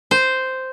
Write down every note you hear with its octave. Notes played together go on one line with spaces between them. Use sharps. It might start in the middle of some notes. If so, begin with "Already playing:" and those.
C5